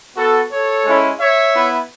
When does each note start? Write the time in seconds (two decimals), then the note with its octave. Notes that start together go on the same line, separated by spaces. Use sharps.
0.16 B3 F#4 A4
0.51 A4 C#5
0.86 G#3 C#4 E4
1.20 C#5 E5
1.54 B3 E4